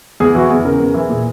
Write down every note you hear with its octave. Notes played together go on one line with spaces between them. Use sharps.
E2 G#4
E3 F#4
E2 G#4
C#3 A#4
E2
E3
A#2 G#4